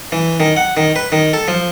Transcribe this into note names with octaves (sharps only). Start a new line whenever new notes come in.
E3
D#3
F#5
D#3
B4
D#3
A4
F3